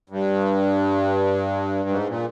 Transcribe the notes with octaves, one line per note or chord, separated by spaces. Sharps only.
G2
G#2
A#2